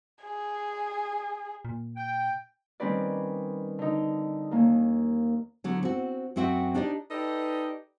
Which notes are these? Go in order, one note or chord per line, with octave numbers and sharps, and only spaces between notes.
G#4
A#2
G5
D#3 G3 C4 C#4 B4 D5
D3 D#4
D#2 A#3 C#4
D3 F#3 B3
C4 F#4
F#2 C4 F#4 E5 F#5 G5
D4 D#4 G4 D5 D#5
D#4 G4 A4 B4 D5